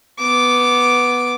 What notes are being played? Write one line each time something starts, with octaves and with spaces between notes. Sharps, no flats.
B3 D6